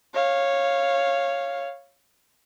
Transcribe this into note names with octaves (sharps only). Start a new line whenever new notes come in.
C#5 F5